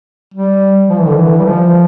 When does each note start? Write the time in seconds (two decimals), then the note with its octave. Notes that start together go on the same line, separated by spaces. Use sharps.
0.34 G3
0.89 F3
0.99 E3
1.08 D3
1.17 E3
1.40 G3
1.45 F3